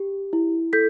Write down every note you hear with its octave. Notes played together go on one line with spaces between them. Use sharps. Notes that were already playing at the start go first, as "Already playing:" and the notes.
Already playing: G4
E4
A4 G6 B6